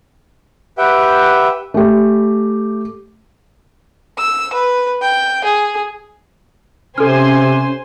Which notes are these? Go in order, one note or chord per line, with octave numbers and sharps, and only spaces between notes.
G4 B4 E5 F#5 G5
A3 G4
E6
B4
G5
G#4
C3 C#4 A4 C5 G#5 C6 F6